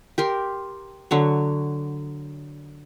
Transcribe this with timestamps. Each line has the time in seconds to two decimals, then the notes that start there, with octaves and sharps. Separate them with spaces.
0.18 G4 A#4 C6
1.11 D3 F#3 C#5